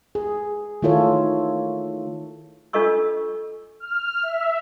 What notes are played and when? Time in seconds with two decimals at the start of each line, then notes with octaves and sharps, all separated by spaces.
0.15 G#4
0.82 D#3 A3 E4 F4 A4 C#5
2.73 D4 F4 A4 D#5 C#6 E6
3.80 F6
4.23 E5